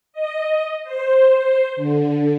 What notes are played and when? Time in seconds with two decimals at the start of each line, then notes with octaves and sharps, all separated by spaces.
0.13 D#5
0.84 C5
1.76 D3